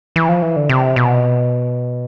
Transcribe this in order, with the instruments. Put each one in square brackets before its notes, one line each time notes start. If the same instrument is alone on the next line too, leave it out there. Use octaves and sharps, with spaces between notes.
[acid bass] E3
F3
E3
D3
C3
B2